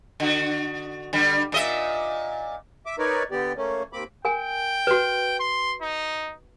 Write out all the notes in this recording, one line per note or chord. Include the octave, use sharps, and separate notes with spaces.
D3 F#4
D3 G3
A#2 D#5 E5
E5 D6
D#4 A#4 B4 C#5 D5
D3 B3 G4 D5
A3 A#3 C#4
D#2 A#3 C4 B5 D6
A#4 G5 G#5
F#4 B4
C6
D#4